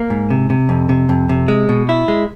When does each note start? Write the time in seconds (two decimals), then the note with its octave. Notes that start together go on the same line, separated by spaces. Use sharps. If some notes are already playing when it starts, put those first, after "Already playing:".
Already playing: A#3
0.10 G#2
0.30 C3
0.50 C3
0.69 F2
0.89 C3
1.09 F2
1.29 C3
1.48 G#3
1.69 B2
1.89 E4
2.08 G#3